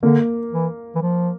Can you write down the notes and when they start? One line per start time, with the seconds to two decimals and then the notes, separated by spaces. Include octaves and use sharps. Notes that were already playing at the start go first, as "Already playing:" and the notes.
0.03 D3 A#3
0.52 E3
0.95 E3
1.02 F3